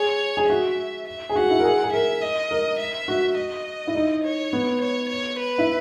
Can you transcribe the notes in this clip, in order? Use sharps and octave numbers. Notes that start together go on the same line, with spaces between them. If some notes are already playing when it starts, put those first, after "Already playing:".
Already playing: G#4 C#5
G#4
F#4 E5
E5
G#4
F#4 F#5
E4
A#4
G#4
G#4
A#4 E5
D#5
A#4
E5
F#4
D#5
E4
D#4
C#5
B3
C#5
C#5
B4
E4